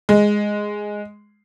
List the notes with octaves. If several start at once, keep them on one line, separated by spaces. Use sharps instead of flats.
G#3